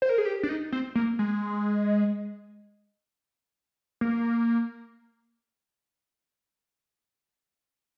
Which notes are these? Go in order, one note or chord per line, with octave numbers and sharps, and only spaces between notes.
C5
A#4
G#4
G4
D4
D#4
C4
A#3
G#3
A#3